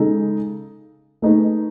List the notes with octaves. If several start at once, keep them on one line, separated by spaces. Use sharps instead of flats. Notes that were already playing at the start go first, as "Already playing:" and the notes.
Already playing: C#3 G#3 D#4 A4
A3 D#4 G#4 B4